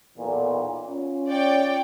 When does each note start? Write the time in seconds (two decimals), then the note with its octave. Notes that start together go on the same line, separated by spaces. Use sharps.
0.18 B1 E2 A#2
0.88 C#4 F4
1.30 C#5 D5 G5